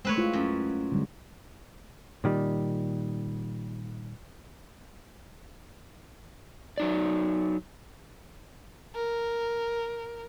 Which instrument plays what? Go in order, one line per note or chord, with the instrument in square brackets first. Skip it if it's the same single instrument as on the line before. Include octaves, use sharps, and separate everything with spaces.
[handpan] G#3 A3 [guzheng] C4 B4 C#5
[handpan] E4 F4 C5
[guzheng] F#2
[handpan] D3 G3 G#3
[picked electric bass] A#2 D#3 G3
[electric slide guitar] F#3 D#4 D5
[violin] A#4